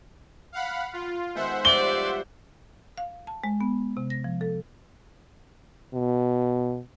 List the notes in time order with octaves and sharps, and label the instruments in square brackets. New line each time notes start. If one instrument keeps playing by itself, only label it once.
[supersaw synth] F5 F#5 B5
F4
[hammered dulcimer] D#3 G#3 B3 [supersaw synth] C5 E5 F#5
[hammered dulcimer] F3 G3 C#5 [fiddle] D5 [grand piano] G7
[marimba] F5
A5
G#3
B3
C3
A#6
F3
A4
[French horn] B2